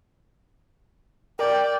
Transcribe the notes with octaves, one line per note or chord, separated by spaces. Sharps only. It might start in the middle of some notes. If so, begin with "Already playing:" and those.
A#4 D5 G5